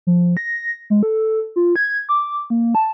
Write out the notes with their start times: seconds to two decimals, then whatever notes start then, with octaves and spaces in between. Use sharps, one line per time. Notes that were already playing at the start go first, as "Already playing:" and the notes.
0.07 F3
0.37 A#6
0.90 G#3
1.03 A4
1.56 F4
1.76 G#6
2.09 D6
2.50 A#3
2.75 A5